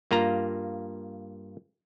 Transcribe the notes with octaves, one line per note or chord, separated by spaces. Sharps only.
G2 A#3 F4 A#5